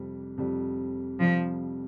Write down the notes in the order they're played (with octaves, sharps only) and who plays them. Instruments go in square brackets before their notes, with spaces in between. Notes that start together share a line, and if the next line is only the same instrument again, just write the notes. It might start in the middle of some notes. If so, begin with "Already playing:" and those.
Already playing: [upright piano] F2 C3 G3
F2 C3 G3
[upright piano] F2 C3 G3 [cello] F3